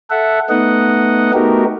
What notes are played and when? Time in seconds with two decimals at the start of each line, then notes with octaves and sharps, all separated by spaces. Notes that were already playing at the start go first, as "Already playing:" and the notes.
0.10 A4 E5 F#5
0.50 A3 B3 D#4 D#5 F#5
1.34 A3 B3 D#4 F#4 G4 A#4